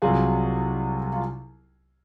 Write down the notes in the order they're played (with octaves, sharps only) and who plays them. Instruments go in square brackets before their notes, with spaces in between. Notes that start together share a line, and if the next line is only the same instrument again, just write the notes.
[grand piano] C2 C3 F#3 F4 G#4
F4